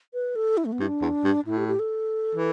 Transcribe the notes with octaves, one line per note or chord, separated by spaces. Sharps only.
B4
A4
E4
A3
B3
G2 E4
D4
E2
G2
A2 E4
G4
G4
A4
E3